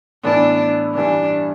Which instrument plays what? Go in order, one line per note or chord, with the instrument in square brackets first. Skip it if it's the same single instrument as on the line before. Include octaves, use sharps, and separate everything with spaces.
[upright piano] A2 E3 B3 E4 [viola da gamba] D4
[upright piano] G2 E3 G3 [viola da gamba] D4